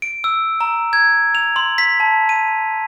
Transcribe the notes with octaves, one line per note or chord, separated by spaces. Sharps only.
D7
E6
A#5
G#6
F7
C6
B6
A5
D#7